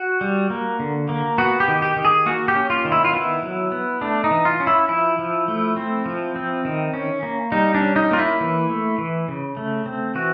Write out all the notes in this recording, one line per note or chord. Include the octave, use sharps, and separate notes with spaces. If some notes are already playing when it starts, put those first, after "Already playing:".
Already playing: F#4
G3
A#3
D3
A#3
B3 F#4
G4
D#3
G4
D#3
G#4
A#3 F#4
G4
C#4
F4
D#3
E4
F4
B3 E4
F#3
B3
A3 D4
D#4
E3
F4
C#4
E4
F3 E4
F3
A3
C4
F3
C4
D#3
C#4
A#3
G3 D#4
D4
C#4
D#4
A#3 F4
E4
E3
A3
E3
C#3
A3
C4
E3 F#4